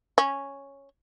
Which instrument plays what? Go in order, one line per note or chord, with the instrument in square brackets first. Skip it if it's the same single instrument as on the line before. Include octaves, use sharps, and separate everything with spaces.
[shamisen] C#4